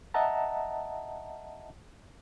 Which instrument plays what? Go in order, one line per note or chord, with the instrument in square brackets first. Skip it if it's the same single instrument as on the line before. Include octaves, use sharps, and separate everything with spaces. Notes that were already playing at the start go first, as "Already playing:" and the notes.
[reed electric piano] D#5 E5 F#5 A5 A#5